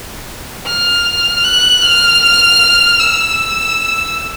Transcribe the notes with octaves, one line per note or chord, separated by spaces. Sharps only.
F6
F#6
F6
E6